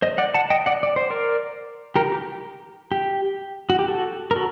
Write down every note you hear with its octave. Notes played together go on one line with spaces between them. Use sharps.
C5 D#5
D5 F#5
F#5 A5
D#5 G5
D5 F#5
D5
C5
A#4 D5
G4 A#4
G4
G4
F#4
G4
F#4 A4
A#4
F#4 A4